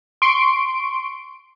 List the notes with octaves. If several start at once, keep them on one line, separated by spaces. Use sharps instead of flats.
C6 C#6 D7